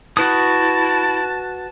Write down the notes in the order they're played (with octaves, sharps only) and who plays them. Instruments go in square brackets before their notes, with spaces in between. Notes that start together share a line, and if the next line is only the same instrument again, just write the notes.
[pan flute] E4 [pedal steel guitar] F#4 B4 D#6 [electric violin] A5